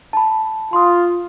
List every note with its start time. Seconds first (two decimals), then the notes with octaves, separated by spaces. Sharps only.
0.13 A5 B5
0.73 F4 C6 D#6